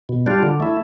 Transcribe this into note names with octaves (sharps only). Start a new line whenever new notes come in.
B2
G3 D4 F4
D3
A3 E4